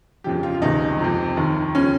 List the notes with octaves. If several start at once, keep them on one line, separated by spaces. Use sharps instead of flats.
F2 C#3 F3 G4
F4
F4
C#2 C3 D#3 D#4
F2 C3 F3
D#2 D#3
C#3 F3 C#4